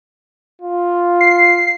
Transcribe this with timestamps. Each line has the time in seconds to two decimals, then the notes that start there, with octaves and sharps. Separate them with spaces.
0.61 F4
1.21 C7